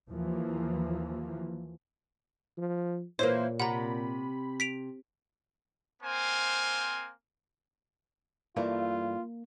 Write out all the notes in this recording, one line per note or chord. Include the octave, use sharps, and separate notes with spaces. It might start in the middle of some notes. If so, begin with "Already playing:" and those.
D#2 E3 F3 A#3
F3
A#2 E3 A#3 C5 C#5
C3 F#5 A#5 B5
B6 D7 F7
A#3 C4 C5 F5 G#5
G2 E3 A3 A#3 F4